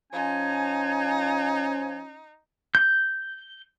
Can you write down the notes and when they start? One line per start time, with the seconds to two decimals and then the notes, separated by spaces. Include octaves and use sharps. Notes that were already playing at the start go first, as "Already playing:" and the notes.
0.12 F3 C#4 D#4 G#5
2.75 G6